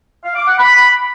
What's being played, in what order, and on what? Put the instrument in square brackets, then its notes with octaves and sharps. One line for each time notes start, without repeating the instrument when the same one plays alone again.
[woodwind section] F5
D6
F#5
B5